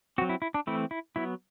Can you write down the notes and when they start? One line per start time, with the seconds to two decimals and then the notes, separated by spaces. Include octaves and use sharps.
0.18 C4 F#4
0.21 F#3
0.29 E4
0.42 E4
0.54 D4
0.67 E3 A3 C4 E4
0.91 E4
1.16 F#3 B3 E4